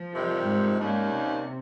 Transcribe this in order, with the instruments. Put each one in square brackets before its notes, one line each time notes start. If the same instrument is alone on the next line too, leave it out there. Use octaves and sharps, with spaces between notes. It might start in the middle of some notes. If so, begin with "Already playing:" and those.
Already playing: [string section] F3
[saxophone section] F2 C3 D#3 G3
[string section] G#2
[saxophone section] D#2 D#3 G3 A#3 C#4 [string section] G#2
[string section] C3